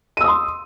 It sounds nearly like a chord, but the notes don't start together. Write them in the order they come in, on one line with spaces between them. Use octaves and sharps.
D#7 E6 D#6 C6